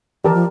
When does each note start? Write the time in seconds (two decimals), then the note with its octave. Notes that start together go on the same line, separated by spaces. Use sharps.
0.24 E3 G4 A#4 D5 A5
0.34 F3